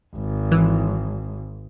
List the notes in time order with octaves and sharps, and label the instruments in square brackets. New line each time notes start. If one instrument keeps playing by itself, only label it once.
[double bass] G#1
[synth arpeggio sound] E3